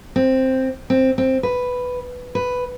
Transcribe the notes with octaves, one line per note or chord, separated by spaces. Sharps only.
C4
C4
C4
B4
B4